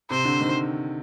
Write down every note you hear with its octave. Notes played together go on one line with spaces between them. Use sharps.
C3 C5
D3
D#3